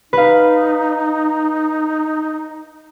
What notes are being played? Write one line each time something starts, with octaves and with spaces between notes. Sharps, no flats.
D#4 B4 F5